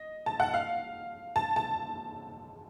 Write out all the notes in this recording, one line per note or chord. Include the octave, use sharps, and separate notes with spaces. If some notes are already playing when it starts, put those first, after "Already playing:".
Already playing: D#5
A5
F#5
F5
A5
A5